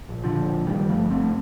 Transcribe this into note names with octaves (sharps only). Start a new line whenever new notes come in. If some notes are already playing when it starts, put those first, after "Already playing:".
A#1
D3 F3
A#2
G2 D#3 G3
F3 A3
G1
A3 C4